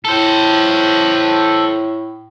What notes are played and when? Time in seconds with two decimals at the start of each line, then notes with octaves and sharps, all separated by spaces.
0.05 A2 A4 C5